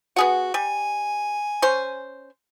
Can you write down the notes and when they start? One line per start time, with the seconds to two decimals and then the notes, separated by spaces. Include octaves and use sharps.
0.16 B3 F#4 G#4 F#5
0.54 G3 G#5
1.62 C#4 C5